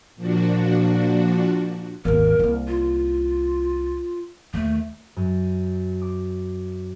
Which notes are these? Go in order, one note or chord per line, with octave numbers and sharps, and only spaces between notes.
A#2 F3 D4 F#4
G#1 D#2 A#4
C2 A#3
F4
D#2 D#3 A3
F#2
D6